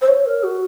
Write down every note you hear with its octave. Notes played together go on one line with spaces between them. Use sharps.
C5
C#5
A#4
F#4